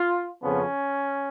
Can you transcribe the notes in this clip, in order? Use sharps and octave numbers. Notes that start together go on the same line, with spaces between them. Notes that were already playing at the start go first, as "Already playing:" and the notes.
Already playing: F4
F2 C#3 F3 B3 C#4